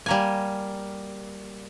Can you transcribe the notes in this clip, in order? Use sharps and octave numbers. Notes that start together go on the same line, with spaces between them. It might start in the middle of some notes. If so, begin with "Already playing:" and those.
G3 A#3 G#5